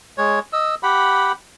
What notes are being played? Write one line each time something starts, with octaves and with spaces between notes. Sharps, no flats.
G#3 C#5
D#5 E6
G4 F#5 B5